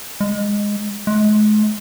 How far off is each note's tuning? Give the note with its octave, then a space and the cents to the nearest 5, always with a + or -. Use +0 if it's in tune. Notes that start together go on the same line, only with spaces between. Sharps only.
G#3 -10
G#3 +40